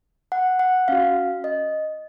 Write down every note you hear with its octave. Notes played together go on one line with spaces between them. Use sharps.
F#5
F#5
C#4 F#4 F5
D#5